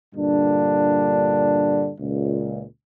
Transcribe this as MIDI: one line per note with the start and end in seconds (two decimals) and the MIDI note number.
0.15 1.93 43
0.15 1.93 46
0.15 1.93 50
0.15 1.93 62
1.99 2.64 37
1.99 2.64 46